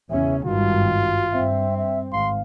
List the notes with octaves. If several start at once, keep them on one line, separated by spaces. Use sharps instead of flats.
E2 C#3 C#4 E5
G#1 G2 D#3 F4 F#4
G2 C4 E5
E5
G#1 F5 C6